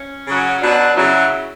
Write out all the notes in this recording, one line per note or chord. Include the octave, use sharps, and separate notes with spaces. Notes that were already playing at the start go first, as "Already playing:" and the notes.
Already playing: C#4
C#3 F#3
B2 F#3 D4
C#3 F#3 E4